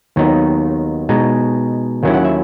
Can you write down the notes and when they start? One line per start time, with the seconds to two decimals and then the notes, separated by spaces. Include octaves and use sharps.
0.16 D#2 D#3 F#3 B3 D#4
1.09 B2 G#3 D#4
2.03 D#2 D#3 F#3 C#4 E4
2.14 F#5
2.25 E5